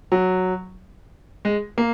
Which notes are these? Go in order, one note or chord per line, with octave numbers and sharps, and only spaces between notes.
F#3
G#3
A#3